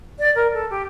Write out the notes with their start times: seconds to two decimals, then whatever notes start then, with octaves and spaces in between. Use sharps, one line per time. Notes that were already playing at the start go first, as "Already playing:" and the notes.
0.19 D5
0.36 A#4
0.54 A4
0.70 G4